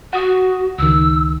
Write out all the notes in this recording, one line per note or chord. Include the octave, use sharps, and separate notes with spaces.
F#4 F#5 D#6
C#2 D#3 E6